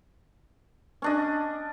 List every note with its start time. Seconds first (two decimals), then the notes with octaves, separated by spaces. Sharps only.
1.02 C#4 D4 D#5